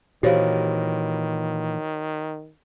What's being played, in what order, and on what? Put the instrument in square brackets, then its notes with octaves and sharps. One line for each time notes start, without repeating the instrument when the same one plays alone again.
[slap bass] A#2 E3 [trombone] D#3 [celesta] F#4 C#5 [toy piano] G4 C5 F5